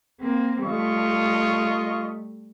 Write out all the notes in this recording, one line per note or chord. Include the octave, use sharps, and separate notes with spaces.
A#3 C4
G3 A3 F4 D#5 C#6